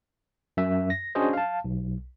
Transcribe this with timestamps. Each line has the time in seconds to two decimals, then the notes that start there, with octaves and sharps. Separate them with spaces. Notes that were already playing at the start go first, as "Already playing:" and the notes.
0.57 F#2 E5
0.90 A#6
1.15 C#4 D4 F#4 G#4 C5 D#5
1.33 F5 A5
1.65 B1